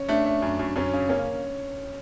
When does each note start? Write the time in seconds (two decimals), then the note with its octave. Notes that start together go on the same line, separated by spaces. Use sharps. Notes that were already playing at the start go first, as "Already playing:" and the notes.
Already playing: C#4
0.08 A3 D4
0.26 A3
0.42 F#2
0.59 F#2
0.76 F#2 C#4
0.93 C#3
1.09 A#3 C#4